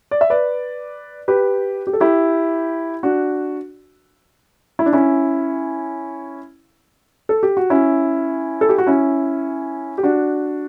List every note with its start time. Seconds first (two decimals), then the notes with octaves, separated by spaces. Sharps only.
0.11 D5
0.21 E5
0.30 B4 D5
1.28 G4 B4
1.87 G4
1.93 A4
2.00 E4 G4
3.03 D4 F#4
4.79 E4
4.86 D4
4.93 C#4 E4
7.29 A4
7.43 G4
7.57 F#4
7.70 C#4 E4
8.61 A4
8.69 G4
8.78 F#4
8.87 C#4 E4
9.98 G4
10.03 D4 F#4